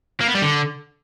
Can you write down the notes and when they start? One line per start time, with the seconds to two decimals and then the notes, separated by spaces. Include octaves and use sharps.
0.21 A#3
0.28 B3
0.35 G3
0.42 D3